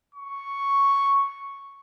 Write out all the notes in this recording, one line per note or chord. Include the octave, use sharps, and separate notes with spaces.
C#6